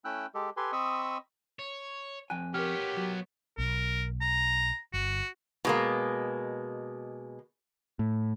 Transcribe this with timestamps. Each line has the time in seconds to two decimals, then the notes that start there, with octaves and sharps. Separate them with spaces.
0.05 A3 C#4 E4 G5 E6 F#6
0.35 G#3 G4 A4
0.57 G4 A4 B4 G#5 C6
0.72 C4 D#5 B5 C#6 D#6 E6
1.59 C#5
2.30 F2 G5 G#5 F#6
2.54 B3 G4 A#4 C#5 F6
2.97 F#3
3.58 B1 A#4
4.21 A#5
4.94 G1 F#4
5.65 B2 G#3 A#3
7.99 A2